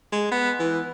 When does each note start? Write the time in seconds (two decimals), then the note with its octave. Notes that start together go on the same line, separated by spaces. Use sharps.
0.12 G#3
0.31 B3
0.59 E3